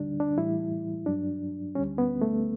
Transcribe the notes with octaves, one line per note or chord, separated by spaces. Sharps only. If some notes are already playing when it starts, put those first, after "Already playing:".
Already playing: D2 D3 G3 D4
D4
A2 E3 G3 E4
G2 F#3 D4
D2 D3 G3 C#4
B3
A3